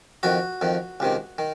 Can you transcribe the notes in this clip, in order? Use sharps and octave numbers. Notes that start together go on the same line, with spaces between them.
F2 D#3 F#4
F2 D#3
C#2 C3 D#3
D#3